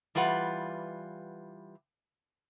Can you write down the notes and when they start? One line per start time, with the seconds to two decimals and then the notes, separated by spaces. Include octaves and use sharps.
0.15 E3 G3 F4 B4 F#5